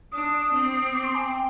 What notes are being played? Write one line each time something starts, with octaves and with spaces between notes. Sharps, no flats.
D4 D#6
C4
D6
C6
G#5
G5